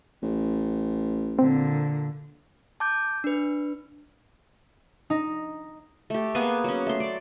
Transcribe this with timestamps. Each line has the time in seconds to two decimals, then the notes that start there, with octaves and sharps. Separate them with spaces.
0.22 A1
1.39 A#2 D3 C4
2.80 A5 D6 G6
3.24 D4 B4
5.10 D#4
6.10 A3 G4
6.34 A#3 B3 G#4 G#5
6.64 F#3 C#4
6.86 A3 C6
7.00 D5 D6